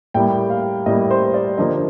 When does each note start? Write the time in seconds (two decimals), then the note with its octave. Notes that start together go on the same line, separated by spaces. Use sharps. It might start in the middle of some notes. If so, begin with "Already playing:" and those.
0.14 A2 G3 A#3 G5
0.50 F5
0.86 A2 G3 A#3 D#5
1.11 C5
1.34 D5
1.58 D3 F3 A#3 D#5